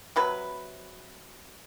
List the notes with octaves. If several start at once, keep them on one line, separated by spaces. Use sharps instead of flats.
C3 F#3 B4